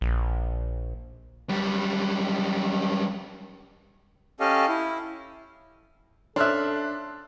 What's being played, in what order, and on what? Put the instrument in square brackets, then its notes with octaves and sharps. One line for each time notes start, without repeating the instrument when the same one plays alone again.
[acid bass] A#1
[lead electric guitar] F#2 G3
[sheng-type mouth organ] C#4 G4 A4 D#5 F5
E4
[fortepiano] C#4 E5 [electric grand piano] D4 F6 F#6 [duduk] A4 [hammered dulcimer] C6